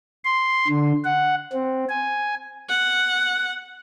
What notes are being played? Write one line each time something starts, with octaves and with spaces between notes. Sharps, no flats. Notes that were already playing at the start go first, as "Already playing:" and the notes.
C6
D3
F#5
C4
G#5
F#5